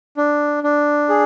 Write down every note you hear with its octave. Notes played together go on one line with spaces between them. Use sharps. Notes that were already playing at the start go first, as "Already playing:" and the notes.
D4
D4
G#4